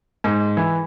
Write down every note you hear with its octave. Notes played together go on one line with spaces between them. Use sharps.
G#2
E3